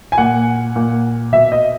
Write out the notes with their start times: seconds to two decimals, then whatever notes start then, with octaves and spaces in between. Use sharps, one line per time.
0.12 G#5
0.18 A#2 F#5
0.76 A#2
1.32 B2 E5
1.52 D#5